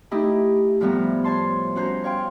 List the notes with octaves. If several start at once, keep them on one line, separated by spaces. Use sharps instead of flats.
A3 D#4 E4 G4
A2 F3 G3 B3 E4 A#5
C5 C#5 A5 C6
C#4 F#4 C5 A#5 G6
C#5 F5 G5 C6